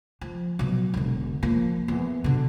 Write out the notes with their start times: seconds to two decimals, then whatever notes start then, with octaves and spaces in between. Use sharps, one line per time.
0.21 F3
0.59 B2 F#3
0.94 E1 D3
1.43 F3 A#3
1.88 E2
2.24 B2 D3